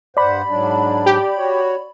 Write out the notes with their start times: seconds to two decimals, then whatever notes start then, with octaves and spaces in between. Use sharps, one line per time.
0.17 G2 C5 D5 F#5 B5
0.49 G#2 F#3 D4
1.06 G4
1.37 F#4 C#5